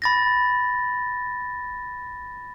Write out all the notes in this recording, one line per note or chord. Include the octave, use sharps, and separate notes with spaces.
B5 A6 A#6